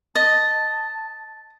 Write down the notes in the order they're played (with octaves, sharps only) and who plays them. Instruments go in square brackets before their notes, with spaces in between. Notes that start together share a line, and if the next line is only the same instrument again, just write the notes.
[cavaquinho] D#5 [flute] A5 [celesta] A6